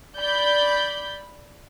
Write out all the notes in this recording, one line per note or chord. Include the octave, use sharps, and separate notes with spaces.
D5 B5 G6